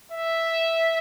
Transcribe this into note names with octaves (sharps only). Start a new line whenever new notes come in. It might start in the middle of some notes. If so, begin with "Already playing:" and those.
E5